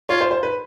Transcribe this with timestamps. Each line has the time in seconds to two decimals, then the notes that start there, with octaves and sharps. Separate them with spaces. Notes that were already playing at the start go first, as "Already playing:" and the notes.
0.09 F4 C#5
0.21 C5
0.31 C5
0.43 B4